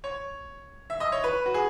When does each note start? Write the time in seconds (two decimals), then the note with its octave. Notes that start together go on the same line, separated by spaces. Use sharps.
0.04 C#5
0.90 E5
1.00 D#5
1.12 C#5
1.24 B4
1.46 F#4
1.54 G#4